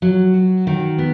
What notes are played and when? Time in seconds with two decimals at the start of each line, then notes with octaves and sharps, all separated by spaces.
0.02 F#3
0.34 F#4
0.67 D#3
0.98 B3